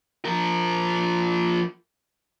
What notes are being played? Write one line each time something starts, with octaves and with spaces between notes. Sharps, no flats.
F3 A#4